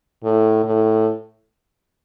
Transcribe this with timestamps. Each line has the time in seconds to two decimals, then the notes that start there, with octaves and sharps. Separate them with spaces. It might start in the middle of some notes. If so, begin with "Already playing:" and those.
0.24 A2
0.64 A2